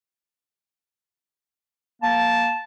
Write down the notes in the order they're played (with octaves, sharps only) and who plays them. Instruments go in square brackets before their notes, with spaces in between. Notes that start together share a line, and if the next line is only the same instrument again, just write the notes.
[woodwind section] A#3 A5